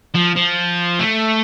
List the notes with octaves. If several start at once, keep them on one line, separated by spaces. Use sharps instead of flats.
F3
F3
A3